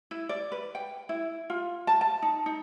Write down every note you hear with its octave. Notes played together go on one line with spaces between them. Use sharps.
E4
D5
B4
G5
E4
F4
A5
A5
D#4
D#4